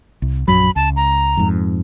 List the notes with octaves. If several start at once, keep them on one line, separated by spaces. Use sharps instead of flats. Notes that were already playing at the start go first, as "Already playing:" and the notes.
C2
A#1 F#2 F#3 B5
C#2 A5
A#5
F2 G#2